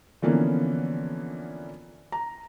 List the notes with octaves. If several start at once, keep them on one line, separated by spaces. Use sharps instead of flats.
D3 E3 F3 A#3 B3 C#4
A#5